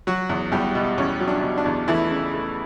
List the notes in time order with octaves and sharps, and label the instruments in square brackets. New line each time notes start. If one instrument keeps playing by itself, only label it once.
[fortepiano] F#3 F#4
E2
E2 G3 G4
B2
E2 C#4
F#3
D4
B2
D4
E2
E3 A3 E4
C#3
A3